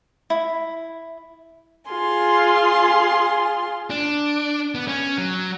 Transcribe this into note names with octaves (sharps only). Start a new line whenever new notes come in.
E4
F4 G#4 C6
D4
B3
C#4
F#3